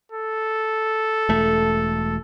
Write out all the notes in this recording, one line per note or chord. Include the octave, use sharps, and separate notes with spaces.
A4
E1 A3